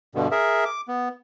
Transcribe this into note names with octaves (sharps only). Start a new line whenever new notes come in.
G2 B2 D3
G#4 A#4 E5
D6
B3